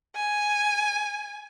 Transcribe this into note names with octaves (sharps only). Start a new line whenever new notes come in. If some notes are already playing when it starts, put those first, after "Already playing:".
G#5